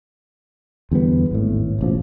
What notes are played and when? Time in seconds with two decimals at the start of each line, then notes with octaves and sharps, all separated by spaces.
0.91 E2 D3 G3 B3
1.31 G#1 A2
1.79 E1 A1 F3